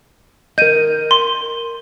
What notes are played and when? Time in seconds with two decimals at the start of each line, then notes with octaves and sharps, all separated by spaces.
0.58 A#4 D#5 G6 D#7
1.11 C6